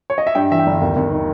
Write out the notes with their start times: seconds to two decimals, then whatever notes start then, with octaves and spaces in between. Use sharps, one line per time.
0.10 C#5
0.18 D#5
0.27 E5
0.35 G2 G5
0.51 E3 E5
0.59 G5
0.67 G1
0.81 D#2
0.96 D#2
1.12 D#3